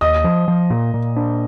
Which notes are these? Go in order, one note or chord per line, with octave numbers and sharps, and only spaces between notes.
D#2 D#5 D#6
F3
F3
A#2
A#2
D4